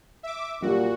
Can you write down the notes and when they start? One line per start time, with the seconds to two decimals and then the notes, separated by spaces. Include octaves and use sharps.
0.23 E5 D6
0.62 A#2 G3 F#4 G4